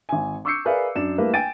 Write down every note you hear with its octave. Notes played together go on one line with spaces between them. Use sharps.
G#1 G#5
C#6 D6 E6 G6 C7 C#7
G#4 A#4 B4 D5 E5 F5
F#2 D4 E7
G3 A3 A#3 E4 B4
G5 G#5 A6 D7 D#7